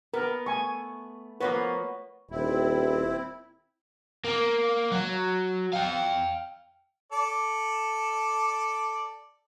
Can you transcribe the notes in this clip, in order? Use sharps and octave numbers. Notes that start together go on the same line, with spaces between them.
B3 A#4
A3 G#5 C#6
F3 A#3 B3 F#4 B4 C#5 F#5
D#1 C4 E4
A#3
F#3
F5 G5
A4 D5